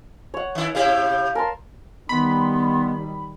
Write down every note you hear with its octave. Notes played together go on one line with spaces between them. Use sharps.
C#5 F#5
D#3 E4
C3 E4 G4 F5
A#4 A5 C6
D#3 G3 B3 B5 C6